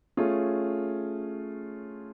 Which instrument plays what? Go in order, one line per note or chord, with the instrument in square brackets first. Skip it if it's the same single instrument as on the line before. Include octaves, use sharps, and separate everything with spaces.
[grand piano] A3 C#4 F4 G#4